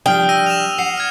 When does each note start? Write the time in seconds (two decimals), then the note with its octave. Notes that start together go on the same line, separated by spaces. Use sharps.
0.06 F3 G3 D4 G5 D#6 F6 G7
0.29 E6 A#6 D#7
0.46 E7 F7
0.78 F#5 C7
0.98 F6 G#6